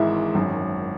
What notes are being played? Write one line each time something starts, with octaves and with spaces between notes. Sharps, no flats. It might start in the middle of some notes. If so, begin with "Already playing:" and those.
Already playing: G#1 G#2 E3 G#3 E4 E5
G#1 F#2 D#3